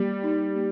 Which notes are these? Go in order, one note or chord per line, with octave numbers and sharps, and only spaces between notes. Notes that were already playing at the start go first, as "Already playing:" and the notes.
Already playing: G3 A#3
D#4
A#3